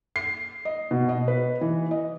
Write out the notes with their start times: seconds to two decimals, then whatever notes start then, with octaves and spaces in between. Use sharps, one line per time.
0.16 C7
0.65 D#5
0.91 B2
1.09 D#5
1.28 B4
1.61 E3
1.91 D#5